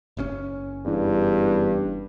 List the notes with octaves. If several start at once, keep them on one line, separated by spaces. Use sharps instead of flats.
F#1 A#2 C#4
E2 G2